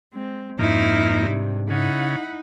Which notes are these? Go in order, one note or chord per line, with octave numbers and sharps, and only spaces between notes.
G#3 C4
F2 G#2 G#3 A#3 C#4 D#4 E4
G2 C3
C#3 D#4 E4 F#5 B5